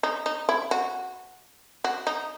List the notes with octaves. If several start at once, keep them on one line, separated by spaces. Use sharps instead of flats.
D#4
D#4
E4
F#4
F#4
D#4